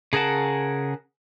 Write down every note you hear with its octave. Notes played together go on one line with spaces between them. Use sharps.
C#3 G#4 A#4 F#5 A5